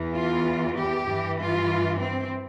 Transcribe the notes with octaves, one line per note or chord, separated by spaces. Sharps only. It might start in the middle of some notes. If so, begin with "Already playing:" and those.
Already playing: E2 E3
F4
G4
G2 E3
F4
C4